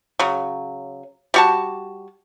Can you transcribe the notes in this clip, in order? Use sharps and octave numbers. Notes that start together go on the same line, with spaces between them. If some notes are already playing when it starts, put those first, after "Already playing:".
C#3 F#3
G3 F#4 A5